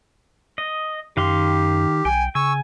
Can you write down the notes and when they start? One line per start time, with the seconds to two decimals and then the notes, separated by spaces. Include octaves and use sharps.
0.58 D#5
1.17 F#2 D#3 G4 F5 C6
2.05 B1 G5 G#5
2.35 C#3 G#5 C#6 E6